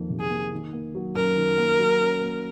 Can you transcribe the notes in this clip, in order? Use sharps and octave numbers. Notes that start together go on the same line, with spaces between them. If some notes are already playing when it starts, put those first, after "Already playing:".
Already playing: F2 D#3 A#3
C3
G#4
A#3
D#3
A#3
F#3
F#2 A#4
D#3
A#3
F#3
C#4
A#3